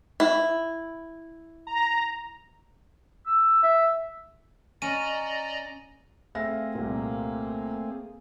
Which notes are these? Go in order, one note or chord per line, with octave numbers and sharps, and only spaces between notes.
E4
A#5
E6
E5
C#4 D5 D#5 A#5 D#7
A3 C4 G#4 E5 F5 A#6
C2 A#2 A#3